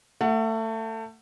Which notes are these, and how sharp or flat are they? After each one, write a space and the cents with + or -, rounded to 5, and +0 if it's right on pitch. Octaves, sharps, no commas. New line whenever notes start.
A3 +25 F#5 +0